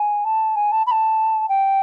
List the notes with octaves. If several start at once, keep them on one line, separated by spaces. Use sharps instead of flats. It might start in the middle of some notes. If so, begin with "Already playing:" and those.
Already playing: G#5
A5
G#5
A5
B5
A5
G5